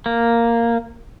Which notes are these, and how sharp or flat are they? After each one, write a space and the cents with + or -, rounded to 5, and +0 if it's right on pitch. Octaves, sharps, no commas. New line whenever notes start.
A#3 -5